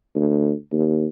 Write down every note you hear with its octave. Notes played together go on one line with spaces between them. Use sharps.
D2
D#2